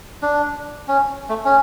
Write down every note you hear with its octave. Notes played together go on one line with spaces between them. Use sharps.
D4
C#4
A3
C#4